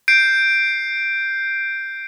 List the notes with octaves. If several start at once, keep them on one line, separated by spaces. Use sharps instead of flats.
G6 C7 D7